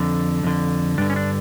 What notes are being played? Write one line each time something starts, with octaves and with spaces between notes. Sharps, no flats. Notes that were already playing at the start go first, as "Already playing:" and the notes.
Already playing: F2 D3 D4
F2 D3
G2 D3 D4
C#4
D4